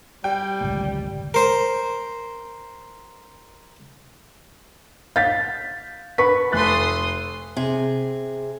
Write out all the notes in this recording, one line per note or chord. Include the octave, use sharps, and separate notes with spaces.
G3 G5
D1 G1 C#2
A#4 C5
F5 G6 A6 B6
B4 B5 C#6 B6
F1 A4 C6 D#6 F#6 A6
C3 G#4